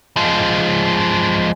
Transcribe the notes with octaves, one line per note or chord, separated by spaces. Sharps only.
F3 G#3